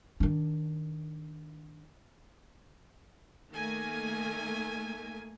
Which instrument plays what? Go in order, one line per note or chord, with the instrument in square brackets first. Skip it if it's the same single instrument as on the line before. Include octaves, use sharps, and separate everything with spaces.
[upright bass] D#3 D4
[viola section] D#3 A3 A#3 G#5